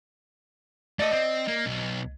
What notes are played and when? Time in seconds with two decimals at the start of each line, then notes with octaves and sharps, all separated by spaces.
0.99 A3 A4 D5 D#5
1.12 C4
1.48 A#3
1.66 B1